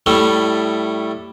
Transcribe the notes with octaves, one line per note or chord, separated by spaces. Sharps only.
A2 G3 A3